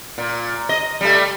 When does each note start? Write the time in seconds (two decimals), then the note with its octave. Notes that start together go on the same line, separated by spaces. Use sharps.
0.18 A#2
0.69 D#5
1.01 G3 A3